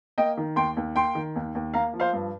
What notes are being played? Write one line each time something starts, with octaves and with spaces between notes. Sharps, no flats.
A#3 D#5 G5
D#3
D#2 G5 C6
D#2
A#3 G5 C6
D#3
D#2
D#2
A#3 F5 A#5
F3
C5 F5
G2